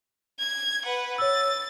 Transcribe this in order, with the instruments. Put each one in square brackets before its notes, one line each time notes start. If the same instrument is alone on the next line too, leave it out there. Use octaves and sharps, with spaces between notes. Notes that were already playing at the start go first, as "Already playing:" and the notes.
[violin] G#6
B4 F#5
[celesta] C#5 E6 [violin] A6